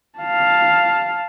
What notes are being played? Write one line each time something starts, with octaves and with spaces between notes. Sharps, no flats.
F5 A5